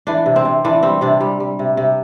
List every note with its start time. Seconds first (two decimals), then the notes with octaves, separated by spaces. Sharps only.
0.07 E3 D4
0.26 C3
0.36 C4
0.45 C3
0.65 E3 D4
0.83 G3 C4
1.01 C3 D4
1.20 G3
1.40 G3
1.59 C3
1.77 C3